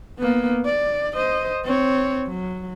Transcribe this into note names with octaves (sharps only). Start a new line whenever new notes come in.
A#3 B3
D5
C5 D#5
C4 C#5
F#3